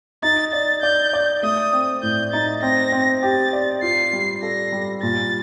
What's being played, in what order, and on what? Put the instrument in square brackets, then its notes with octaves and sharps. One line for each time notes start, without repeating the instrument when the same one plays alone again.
[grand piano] D#4 [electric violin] A6
[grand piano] D5 [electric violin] A6
[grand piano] D5 [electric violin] G6
[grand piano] D5
[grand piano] A3 [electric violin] D#6
[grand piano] C4
[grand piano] A2 [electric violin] G6
[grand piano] D#4 [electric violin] A6
[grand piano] C4 [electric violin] A#6
[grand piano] C4
[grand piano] G4 [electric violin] A6
[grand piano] D5
[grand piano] F4 [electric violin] C7
[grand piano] G3
[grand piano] A4 [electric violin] A#6
[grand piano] G3
[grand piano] A#2 [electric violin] A6